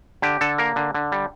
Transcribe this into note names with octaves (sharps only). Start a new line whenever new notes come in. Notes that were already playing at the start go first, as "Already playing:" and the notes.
D3 G4
D3 A4
A#3 A#4
D3
D3
G3